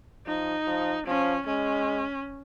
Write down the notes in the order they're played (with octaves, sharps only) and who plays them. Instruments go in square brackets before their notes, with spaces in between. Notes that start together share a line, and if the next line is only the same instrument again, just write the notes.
[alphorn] F3 [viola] D#4
[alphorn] F3
[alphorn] F3 [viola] C#4
[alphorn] G#3 [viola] C#4